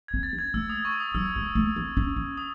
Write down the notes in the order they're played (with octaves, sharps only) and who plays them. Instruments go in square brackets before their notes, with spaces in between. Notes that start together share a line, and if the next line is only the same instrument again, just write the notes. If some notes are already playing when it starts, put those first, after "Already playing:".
[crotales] G#6
[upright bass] C4
[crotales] A6
[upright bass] C#4
[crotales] G#6
[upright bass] A3 [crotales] E6
[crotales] D#6
C#6
D#6
[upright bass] F#3 [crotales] E6
[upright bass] G#3
A3
C4
C#4
C#4
[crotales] D#6